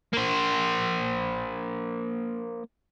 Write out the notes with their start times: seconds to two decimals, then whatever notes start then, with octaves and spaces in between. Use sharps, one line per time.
0.13 A#3 C5